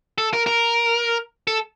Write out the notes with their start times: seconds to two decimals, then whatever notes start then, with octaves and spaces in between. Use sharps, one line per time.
0.18 A4
0.33 A#4
0.47 A#4
1.47 A4